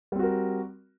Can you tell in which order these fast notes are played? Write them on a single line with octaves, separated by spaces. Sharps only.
G3 C4 F#4 A#4